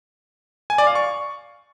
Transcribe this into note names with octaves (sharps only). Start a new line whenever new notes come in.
G#5
D5
F5
C#6